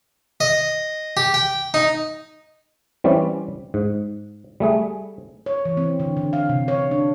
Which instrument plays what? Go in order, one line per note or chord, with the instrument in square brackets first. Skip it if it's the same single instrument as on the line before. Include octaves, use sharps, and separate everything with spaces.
[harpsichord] D#5
G4
G5
D#4
[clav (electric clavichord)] E3 G3 C4 C#4 D5
G#2
G3 A3 G#4
[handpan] C#5
E3
C4
D3
D3
F5
C3
C#5
D4